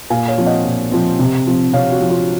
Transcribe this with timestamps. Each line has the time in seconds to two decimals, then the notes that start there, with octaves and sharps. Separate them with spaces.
0.10 A#2 F5 G#5
0.28 C#5 F5
0.38 F3 C4
0.46 D#5 F#5
0.65 A#2
0.92 F3 C4
1.19 C3
1.47 F3 C4
1.73 C3 C#5 F5
1.92 F#4
2.01 F3 C4
2.10 F4